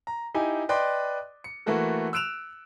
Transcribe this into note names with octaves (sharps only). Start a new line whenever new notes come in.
A#5
D#4 E4 G4 G#5
B4 D5 D#5 G5 C6
C#7
E3 A3 A#3 F#4 A4
E6 F#6 D7 E7 F7